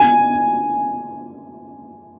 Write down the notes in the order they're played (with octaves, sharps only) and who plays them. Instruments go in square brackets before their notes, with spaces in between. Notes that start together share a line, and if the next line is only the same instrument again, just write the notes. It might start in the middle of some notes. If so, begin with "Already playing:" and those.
Already playing: [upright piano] G#5